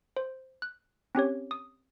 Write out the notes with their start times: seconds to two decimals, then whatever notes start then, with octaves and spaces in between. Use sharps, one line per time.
0.17 C5
0.62 F#6
1.15 C4 C#4 G4 C#5
1.51 D#6